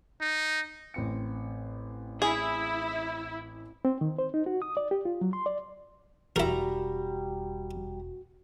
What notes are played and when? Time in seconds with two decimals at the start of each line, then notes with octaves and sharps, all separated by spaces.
0.21 D#4
0.94 A1 C4 C#7
2.22 E4 G#4
3.85 C4
4.01 D#3
4.18 C5
4.34 D#4
4.46 F#4
4.62 D#6
4.77 D5
4.91 G4
5.05 F4
5.21 F#3
5.33 C6
5.46 D5
6.36 E1 G3 E4 F#4 A#4 A#5